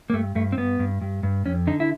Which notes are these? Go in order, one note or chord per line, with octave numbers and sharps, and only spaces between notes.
A#3
G2 A3
G2 A3
C4
G2 B3
G2
G2
G2
F2 C#4
D3 D#4
E4